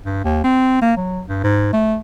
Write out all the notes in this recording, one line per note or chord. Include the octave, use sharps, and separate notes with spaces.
G2
D#2
C4
A#3
F#3
G2
G#2
A3